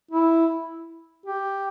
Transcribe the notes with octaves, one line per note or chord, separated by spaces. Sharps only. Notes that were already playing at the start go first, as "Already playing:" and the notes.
E4
G4